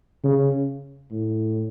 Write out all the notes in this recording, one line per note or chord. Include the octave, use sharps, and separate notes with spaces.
C#3
A2